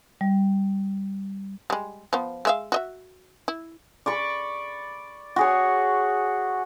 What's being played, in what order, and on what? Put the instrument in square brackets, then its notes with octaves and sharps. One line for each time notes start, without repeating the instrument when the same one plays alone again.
[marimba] G3
[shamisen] G3 G#3
F3 B3
G#3 E5 F5
F#4 D#5 E5
E4
[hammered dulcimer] D5 B5 C#6
F#4 G#4 C#5